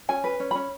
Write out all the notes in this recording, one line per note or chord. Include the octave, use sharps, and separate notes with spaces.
C#4 G#5
B4
C#4
C#4 B5